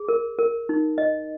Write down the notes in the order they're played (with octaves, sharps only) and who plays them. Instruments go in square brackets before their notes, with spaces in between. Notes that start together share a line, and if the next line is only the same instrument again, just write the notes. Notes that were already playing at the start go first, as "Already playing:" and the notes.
Already playing: [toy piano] G#4
A#4
A#4
D#4
D#5